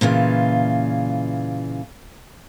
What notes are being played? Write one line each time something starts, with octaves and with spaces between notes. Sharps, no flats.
A#2 C#3 E3 F4